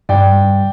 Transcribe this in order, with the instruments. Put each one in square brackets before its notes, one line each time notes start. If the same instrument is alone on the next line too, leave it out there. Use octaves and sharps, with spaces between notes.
[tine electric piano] G2 [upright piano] D5 G5
[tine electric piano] G3
G2